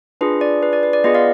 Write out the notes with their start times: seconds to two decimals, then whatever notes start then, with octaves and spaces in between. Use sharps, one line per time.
0.21 D4 F4 G#4 B4
0.41 D5
0.63 B4
0.73 D5
0.83 B4
0.93 D5
1.04 B3 F4 G#4 B4 D#5
1.14 D5 F5